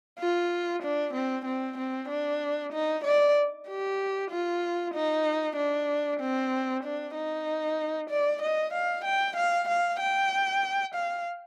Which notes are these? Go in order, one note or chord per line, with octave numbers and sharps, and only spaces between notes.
F4
D4
C4
C4
C4
D4
D#4
D5
G4
F4
D#4
D4
C4
D4
D#4
D5
D#5
F5
G5
F5
F5
G5
F5